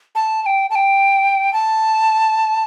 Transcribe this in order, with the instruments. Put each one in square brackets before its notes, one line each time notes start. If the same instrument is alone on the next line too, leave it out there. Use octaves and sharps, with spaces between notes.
[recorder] A5
A5
G5
A5
G5
A5